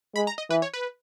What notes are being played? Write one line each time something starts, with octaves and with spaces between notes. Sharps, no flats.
G#3 B5
A#5
D#5
E3 B4
C#5
B4